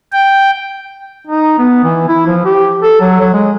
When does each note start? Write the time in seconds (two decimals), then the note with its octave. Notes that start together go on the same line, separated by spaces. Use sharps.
0.12 G5
1.27 D#4
1.58 B3
1.84 E3
2.08 E4
2.27 F3
2.45 G4
2.83 A4
3.01 F#3
3.20 F#3
3.33 G#3